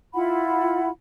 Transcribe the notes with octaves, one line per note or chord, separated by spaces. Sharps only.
E4 F4 F#5 B5